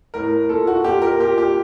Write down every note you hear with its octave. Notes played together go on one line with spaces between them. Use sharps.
A2 A#4
A#2 A4
F#4
A#2 G4
A#4
A#2 G4
G4